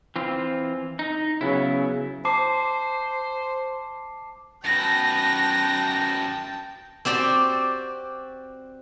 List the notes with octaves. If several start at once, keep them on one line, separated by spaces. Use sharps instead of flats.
E3 C4 F4
D#4
C#3 F#3 B3 E4
C5 A5 D6 C7
F#2 B4 G5 A5 A#6
C4 F#4 G4 D5